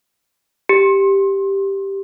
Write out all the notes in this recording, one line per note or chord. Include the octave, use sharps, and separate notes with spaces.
G4